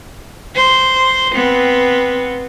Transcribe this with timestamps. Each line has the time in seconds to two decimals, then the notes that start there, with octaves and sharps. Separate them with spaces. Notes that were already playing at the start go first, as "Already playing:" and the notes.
0.55 C5
1.34 B3 C4